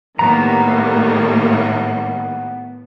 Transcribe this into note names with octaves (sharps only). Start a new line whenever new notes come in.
A2 D#3 G3 A#3 B3 A#5